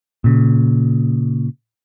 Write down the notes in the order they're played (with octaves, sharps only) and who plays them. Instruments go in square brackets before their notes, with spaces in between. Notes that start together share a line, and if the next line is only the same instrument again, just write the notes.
[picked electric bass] A#2 C#3